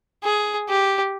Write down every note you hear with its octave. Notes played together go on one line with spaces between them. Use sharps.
G#4
G4